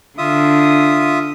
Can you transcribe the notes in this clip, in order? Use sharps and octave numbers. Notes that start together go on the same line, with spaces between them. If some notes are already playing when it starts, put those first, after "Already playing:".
D3 F4 E5 D#6